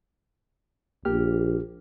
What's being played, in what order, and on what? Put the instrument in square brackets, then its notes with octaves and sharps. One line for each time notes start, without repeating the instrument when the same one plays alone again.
[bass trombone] A#1 [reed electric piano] A#3 G4 F6